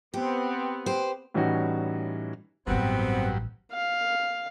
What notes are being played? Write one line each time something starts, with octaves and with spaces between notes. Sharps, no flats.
B3 C4 G4
G4 B4 C5
A2 E3 G3 C#4 D#4 F#4
A1 G2 F#3 B3 C4 E4
F5